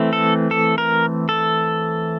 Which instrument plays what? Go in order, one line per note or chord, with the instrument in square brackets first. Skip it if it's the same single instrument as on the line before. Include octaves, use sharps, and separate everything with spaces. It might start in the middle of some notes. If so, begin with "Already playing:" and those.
Already playing: [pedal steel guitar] E3 A3 C4
A4
A4
A#4
A4